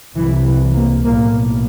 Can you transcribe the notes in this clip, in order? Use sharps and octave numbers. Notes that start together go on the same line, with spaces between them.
C2 C3 E3
E3
A#3
B1 A2 A#3